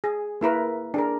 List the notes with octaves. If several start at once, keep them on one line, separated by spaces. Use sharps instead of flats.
G#4
A#3 E4 A#4 B4
D4 G#4 A#4